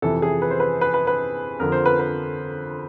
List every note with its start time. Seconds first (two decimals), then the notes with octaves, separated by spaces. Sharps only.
0.02 F2 C3 E3 A4
0.22 G#4
0.42 B4
0.51 C5
0.60 B4
0.81 B4
0.94 B4
1.07 B4
1.60 F2 D3 F3 A#4
1.72 C5
1.86 B4
1.99 B4